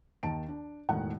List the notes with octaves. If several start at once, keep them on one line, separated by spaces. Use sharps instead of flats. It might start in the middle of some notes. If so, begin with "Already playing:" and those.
D#2 D#3 A5 D7
D4
E1 A2 D#3 D#4 F#5